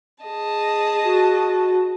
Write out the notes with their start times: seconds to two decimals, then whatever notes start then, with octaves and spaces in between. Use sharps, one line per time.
0.24 G#4 D#5 A5
1.04 F#4